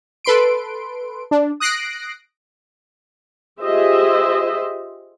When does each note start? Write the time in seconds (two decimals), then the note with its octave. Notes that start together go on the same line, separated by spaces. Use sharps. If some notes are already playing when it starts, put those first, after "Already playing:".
0.24 A4 B4 C6 D7
1.31 D4
1.60 D#6 F#6 A#6 C7 D7
3.61 F4 G4 G#4 C5 D#5 E5